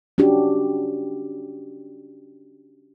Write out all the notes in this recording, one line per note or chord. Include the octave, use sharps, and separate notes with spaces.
C#4 D4 F#4 G4